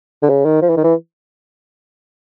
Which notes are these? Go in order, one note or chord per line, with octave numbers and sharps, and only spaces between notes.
D3
C#3
D#3
F3
E3
D#3
E3